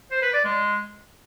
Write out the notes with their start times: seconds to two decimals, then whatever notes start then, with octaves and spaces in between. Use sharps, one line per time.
0.11 C5
0.22 B4
0.33 D5
0.45 G#3